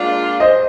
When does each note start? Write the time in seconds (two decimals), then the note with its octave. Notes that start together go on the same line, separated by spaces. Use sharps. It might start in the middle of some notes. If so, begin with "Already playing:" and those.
Already playing: A#2 G#3 D4 F4 D5
0.40 C5 D#5